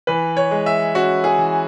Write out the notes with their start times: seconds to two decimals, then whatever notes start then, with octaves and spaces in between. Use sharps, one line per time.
0.07 E3 B4
0.37 C#5
0.51 G#3
0.66 E5
0.95 C#4 F#4
1.24 G#4
1.38 E3